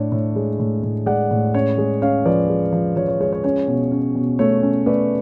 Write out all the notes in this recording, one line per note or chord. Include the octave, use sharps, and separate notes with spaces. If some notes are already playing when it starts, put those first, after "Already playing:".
Already playing: A2 D4 C#5
A2
G#3
A2
A2
G#3 D5 F#5
A2
C#4 C#5
G#3
C#4 C#5 F5
F3 B4 D5
G#3
F3
F3 C#5
C#5
G#3 C#5
C#5
C#4 C#5
B2
C#4
B2
A3 C#5
C#4
A3 B4 D5